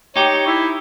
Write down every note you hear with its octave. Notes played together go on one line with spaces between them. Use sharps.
D#4 G4 C#5
E4